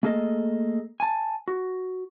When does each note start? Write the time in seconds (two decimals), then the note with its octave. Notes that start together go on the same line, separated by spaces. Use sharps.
0.03 A3 A#3 G#4 A4 D#5
1.00 G#5 A5
1.48 F#4